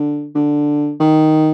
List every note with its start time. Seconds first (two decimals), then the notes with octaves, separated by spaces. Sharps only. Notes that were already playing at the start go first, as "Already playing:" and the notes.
Already playing: D3
0.35 D3
1.00 D#3